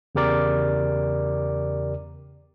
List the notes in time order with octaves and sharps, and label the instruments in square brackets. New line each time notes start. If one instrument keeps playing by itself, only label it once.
[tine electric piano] E2 C#3 G4 A#4 D5 D6